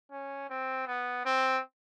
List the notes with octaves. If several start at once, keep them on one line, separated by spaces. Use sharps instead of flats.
C#4
C4
B3
C4